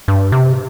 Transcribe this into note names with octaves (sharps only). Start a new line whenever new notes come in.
G2
C3